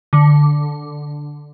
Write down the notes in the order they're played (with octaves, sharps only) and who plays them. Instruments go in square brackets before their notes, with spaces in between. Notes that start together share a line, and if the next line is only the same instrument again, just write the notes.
[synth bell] D3